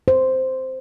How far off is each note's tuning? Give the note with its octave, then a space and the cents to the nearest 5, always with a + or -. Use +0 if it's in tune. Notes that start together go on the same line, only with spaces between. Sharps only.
C5 -5